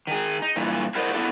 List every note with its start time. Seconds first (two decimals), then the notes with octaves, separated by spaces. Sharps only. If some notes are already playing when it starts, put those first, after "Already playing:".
0.07 D#3 G#4
0.42 D#4
0.56 G2 A#2 E3
0.95 E4 F#4 A#4 C5 D5 D#5
1.13 B3 D#4 E4 A4 D5